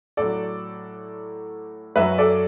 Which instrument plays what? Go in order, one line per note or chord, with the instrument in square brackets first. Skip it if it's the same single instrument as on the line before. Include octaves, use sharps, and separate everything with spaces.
[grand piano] A2 F#3 A4 D5
F#2 F#3 B4 E5
A4 D5